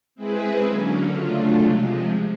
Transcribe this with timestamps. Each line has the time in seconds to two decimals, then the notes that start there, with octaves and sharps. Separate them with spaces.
0.15 G#3 C4 E4 G#4 B4
0.63 D3 F#3 A#3 C#4
1.12 C#3 F#3 A3 D4 F4
1.61 C3 F3 G#3